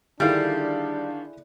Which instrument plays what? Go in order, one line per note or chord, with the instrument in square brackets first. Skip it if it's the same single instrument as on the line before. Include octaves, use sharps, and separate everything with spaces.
[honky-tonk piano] D3 D#3 F5 [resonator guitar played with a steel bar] G3 [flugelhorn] D4 [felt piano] E4 G#4 A4